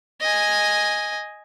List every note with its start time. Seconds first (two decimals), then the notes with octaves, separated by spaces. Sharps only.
0.21 D#5 G#5